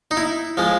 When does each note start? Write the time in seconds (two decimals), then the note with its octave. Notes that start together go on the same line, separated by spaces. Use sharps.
0.11 D#4
0.17 E4
0.57 F3 G#3